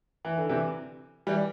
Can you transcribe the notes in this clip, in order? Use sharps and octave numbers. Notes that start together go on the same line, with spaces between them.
E3
D3
C3 E3
E3 G3